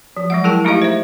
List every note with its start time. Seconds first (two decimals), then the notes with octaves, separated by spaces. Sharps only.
0.17 F3
0.30 F#3 G#3 F#5
0.44 E4 G#4 A#4 G5 A5
0.65 A3 D#4 E4 G4 D#5 F5
0.82 C5 E5